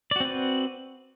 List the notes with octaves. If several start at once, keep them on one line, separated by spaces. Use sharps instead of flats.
C4 F#4 B4 D5